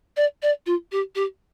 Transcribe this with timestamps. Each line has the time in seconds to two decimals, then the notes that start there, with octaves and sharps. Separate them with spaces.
0.17 D5
0.42 D5
0.66 F4
0.92 G4
1.15 G4